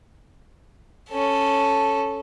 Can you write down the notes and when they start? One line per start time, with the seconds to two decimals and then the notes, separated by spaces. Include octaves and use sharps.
1.11 C#4 A4